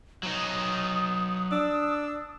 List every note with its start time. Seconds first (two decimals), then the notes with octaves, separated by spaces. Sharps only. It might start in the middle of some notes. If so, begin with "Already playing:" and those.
0.23 F#3 D#4 D#6
1.52 D4 E6